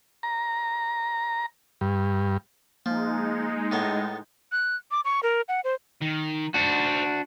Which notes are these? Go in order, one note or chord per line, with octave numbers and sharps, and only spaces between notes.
A#5
G2
F3 G#3 A#3 D#4
A2 A3 B3
F#6
D6
C#6
A#4
F#5
C5
D#3
D4 F#4 C5 F#5